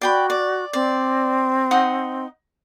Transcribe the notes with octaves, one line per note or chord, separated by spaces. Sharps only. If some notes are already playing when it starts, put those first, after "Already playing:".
F#4 D5 G5 B5
D5
C4 D5
D#4 F#5 D#6